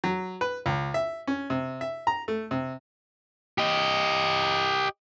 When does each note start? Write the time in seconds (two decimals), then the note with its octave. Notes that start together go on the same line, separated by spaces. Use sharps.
0.04 F#3
0.41 B4
0.66 C#2
0.94 E5
1.28 C#4
1.50 C3
1.81 E5
2.07 A#5
2.28 A3
2.51 C3
3.58 G4 D#5